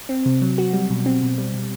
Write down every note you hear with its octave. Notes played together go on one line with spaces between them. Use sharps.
C4
C3
F#3
F#4
G3
B2
C4
B2
G3
B2